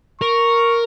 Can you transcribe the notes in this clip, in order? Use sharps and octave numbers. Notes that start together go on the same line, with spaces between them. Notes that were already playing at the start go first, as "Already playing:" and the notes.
A#4 C#6